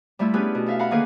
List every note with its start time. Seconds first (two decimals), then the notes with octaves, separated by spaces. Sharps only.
0.19 G3 A3 E4 F4 E6
0.34 B3 C#4 D4 G4 G#4 B4
0.55 B2
0.66 A4 E5 F5
0.79 F5 F#5 A#5 B5
0.91 D3 D#3 A#3 G#4 A4 B4